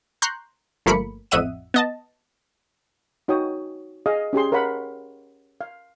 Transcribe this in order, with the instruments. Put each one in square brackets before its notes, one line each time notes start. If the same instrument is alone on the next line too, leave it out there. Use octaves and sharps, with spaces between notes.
[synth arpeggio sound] A#5 C6 C#6 F#6 G6
G1 F3 A3 A#3 B5 C#7
A1 F2 D#5 E5 F#5 D#7
B3 D#5 A5
[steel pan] D#4 F#4 C#5 G5 D#6
G#4 D#5 F5 D#6
C#4 G4 G#4 C6
A#4 C#5 F5 F#5 B5
F5